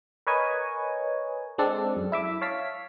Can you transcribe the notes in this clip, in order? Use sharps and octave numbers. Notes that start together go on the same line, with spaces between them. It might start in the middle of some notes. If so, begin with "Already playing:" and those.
A#4 B4 C#5 D#5 G#5
G#3 C4 D4 A4
F#2
E4 E5 D6
C#5 F5 A5 B6